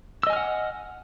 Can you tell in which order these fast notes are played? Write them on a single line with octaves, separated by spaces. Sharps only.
E6 D#5 G#5 F6 F#5